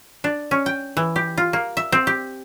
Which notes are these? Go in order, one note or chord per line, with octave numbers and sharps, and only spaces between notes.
D4
C#4
G5
E3
G4
F4
A#3
E5
C4
G4